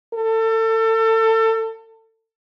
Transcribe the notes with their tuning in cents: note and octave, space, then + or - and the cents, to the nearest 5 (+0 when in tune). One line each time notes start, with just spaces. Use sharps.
A4 +30